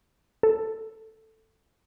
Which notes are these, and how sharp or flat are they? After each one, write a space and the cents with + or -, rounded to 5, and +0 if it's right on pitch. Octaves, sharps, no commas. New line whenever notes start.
A4 +5